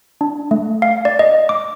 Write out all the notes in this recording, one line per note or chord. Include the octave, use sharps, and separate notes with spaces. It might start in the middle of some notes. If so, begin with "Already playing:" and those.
D4
A3
F5
D5
D#5
D6